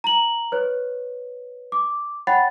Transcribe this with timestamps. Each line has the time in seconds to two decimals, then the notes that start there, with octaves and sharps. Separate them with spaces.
0.04 A#5 F#7
0.52 B4 C#5
1.72 D6
2.27 C#5 F#5 G5 B5 A6